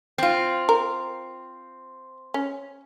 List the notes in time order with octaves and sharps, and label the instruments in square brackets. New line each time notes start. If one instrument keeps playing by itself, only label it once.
[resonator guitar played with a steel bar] C4 F4
[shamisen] A#4
C#4